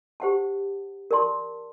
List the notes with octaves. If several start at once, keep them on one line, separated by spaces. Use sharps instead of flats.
G4 C5 F#5 A5
A#4 D5 A5 C6